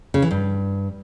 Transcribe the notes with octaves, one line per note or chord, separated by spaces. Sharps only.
C#3
E3
G2